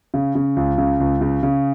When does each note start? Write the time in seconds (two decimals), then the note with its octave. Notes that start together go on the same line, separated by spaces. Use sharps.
0.14 C#3
0.35 C#3
0.56 C#2
0.78 C#3
1.00 C#2
1.21 C#3
1.43 C#3